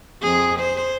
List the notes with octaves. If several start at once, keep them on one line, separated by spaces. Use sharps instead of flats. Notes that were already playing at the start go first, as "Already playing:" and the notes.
F2 G#4
C5